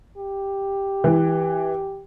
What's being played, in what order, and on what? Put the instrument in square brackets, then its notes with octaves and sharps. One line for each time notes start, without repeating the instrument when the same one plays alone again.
[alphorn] G4
[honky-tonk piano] E3